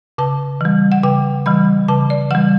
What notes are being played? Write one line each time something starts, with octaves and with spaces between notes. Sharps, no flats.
C#3 A5
E3 G3
F#5
C#3 G5
E3 G3 B5
C#3 A5
D5
E3 G3 F#5